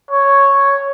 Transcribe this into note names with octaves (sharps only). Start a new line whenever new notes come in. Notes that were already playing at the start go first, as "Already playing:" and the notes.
C#5